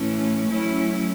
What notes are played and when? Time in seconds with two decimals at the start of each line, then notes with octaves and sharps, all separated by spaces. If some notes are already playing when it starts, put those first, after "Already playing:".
Already playing: A2 E3 A3 C#4
0.47 F#3 A3 C#4 E4